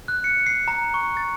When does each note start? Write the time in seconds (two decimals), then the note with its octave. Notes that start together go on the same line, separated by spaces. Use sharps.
0.08 F#6
0.24 C#7
0.46 C7
0.68 A#5
0.94 C#6
1.17 A6